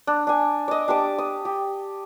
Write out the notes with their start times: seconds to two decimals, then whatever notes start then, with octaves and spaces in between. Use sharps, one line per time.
0.07 D4
0.27 D4 G#5
0.68 D5 D#5
0.88 D4 G4 A5 D6
1.18 D#6
1.45 G4